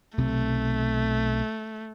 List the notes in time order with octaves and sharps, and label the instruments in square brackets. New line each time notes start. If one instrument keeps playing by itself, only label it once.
[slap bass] B1 C3 C4 [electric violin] A3